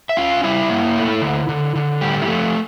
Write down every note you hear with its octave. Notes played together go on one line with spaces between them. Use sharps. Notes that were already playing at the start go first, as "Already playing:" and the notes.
E5
C#4 F4 F5
G3 E4 E5
A#3
A3
D3
D3
D3
A2 G3 G4
E4
F3 A3 F4